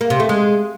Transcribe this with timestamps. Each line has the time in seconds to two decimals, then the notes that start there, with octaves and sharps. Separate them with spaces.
0.01 A#3
0.10 C3
0.20 A3
0.29 G#3